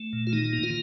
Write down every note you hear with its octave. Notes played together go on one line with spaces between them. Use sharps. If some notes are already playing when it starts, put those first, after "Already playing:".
Already playing: A3
A#2
F4
D#3 D#4
A#3
F4